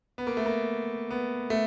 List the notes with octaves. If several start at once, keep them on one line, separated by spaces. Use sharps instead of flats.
B3
A#3
A3
A#3
B3
A3